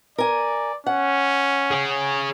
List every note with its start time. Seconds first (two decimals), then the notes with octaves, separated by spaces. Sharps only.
0.18 A#4 D5 G#5
0.86 C#4 F#5
1.71 G#4 C#5